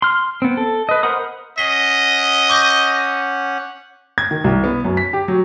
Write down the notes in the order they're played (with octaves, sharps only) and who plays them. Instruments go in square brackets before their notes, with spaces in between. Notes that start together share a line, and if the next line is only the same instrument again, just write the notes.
[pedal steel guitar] C6 F6
B3 C4
A4
B4 D#5
A#4 C5 F#5 B5 D#6
[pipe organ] C#4 F#5 [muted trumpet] D#5 [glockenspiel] B6 C7 G7
[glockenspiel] C#6 D6 G6
[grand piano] G#6
D#3
C2
B3
F#2
B6
G4
F#3